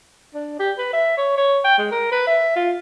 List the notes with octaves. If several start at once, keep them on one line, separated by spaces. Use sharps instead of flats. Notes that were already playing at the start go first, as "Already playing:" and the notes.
D4
G4
B4
E5
C#5
C#5
G5
G#3
A#4
B4
E5
F4